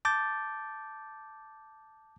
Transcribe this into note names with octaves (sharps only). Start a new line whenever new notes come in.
A5 D6 G6 A6